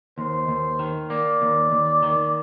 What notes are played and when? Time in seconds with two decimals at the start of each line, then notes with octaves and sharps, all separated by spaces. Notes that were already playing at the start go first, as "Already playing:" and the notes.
0.18 D#2 C5
0.48 D#2
0.79 D#3
1.10 A#3 D5
1.42 D#2
1.72 D#2
2.03 D#3